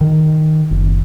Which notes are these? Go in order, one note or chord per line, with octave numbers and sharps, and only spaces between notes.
D#3
F#1